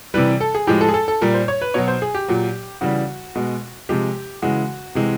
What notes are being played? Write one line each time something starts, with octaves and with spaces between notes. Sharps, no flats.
C3 E3 G3 B4
A4
G#4
A2 F3 G#3 G4
A4
G#4
A4
A4
A#2 G3 A#4
C5
C#5
B4
B2 F#3 C#5
C5
G#4
G4
A#2 F#3
C#3 E3 G3 F#4
B2 G#3
C3 F3 G#3 G4
C#3 E3 G#3 F#4
C3 E3 G#3